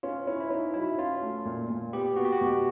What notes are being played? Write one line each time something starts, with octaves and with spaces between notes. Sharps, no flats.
C#4 F4
C#4 E4
E4
C#4 D#4
F#3 E4
C#4 F4
A3
A#2
A#2
B3 G4
B3 F#4
G4
F#4
B2